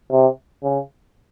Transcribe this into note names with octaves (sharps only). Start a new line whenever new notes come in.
C3
C#3